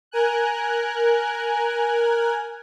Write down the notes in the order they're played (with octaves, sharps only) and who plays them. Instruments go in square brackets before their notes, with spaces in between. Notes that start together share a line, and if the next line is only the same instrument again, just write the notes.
[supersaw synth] A#4 G#5 F#6